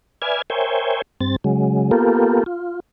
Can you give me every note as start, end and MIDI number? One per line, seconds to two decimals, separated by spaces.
0.22 0.42 71
0.22 0.42 74
0.22 0.42 76
0.22 0.42 80
0.22 0.42 89
0.22 0.42 92
0.50 1.02 70
0.50 1.02 72
0.50 1.02 73
0.50 1.02 76
0.50 1.02 79
0.50 1.02 80
1.21 1.36 43
1.21 1.36 60
1.21 1.36 93
1.44 1.91 49
1.44 1.91 54
1.44 1.91 56
1.91 2.44 58
1.91 2.44 59
1.91 2.44 65
1.91 2.44 67
1.91 2.44 69
1.91 2.44 70
2.46 2.80 65